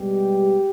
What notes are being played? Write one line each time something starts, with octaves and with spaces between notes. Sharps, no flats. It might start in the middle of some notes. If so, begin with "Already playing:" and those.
Already playing: B2 G3 G#3 B3 G4